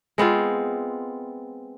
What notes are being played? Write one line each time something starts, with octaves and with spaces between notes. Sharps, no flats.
G#3 B3 C4 F4